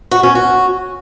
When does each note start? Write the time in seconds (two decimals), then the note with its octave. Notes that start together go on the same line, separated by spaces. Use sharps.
0.11 F#4
0.23 C#4
0.35 F#4